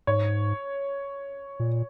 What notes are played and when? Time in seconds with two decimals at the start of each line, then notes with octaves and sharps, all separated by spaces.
0.07 G#2 C#5
1.60 A#2